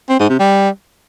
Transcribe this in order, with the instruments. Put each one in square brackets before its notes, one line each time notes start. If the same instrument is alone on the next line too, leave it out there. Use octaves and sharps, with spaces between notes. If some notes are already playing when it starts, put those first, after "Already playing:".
[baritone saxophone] C4
G#2
C3
G3